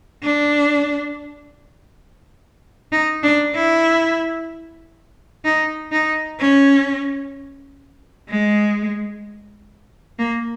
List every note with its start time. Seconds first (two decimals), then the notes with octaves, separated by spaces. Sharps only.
0.23 D4
2.92 D#4
3.23 D4
3.55 E4
5.44 D#4
5.92 D#4
6.39 C#4
8.29 G#3
10.19 A#3